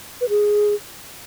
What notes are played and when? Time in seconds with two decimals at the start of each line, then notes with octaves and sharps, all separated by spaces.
0.21 B4
0.29 G#4